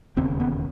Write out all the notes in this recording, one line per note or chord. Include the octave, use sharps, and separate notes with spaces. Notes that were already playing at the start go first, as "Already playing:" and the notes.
E1 D#2 C#3 C4
B3